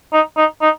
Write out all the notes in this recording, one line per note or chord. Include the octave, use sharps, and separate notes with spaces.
D#4
D#4
D#4